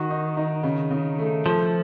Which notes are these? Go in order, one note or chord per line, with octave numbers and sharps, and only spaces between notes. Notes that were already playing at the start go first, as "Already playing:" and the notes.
Already playing: D#3 F#4
D#4
D#4
C#3
C#3
A3
F3 A3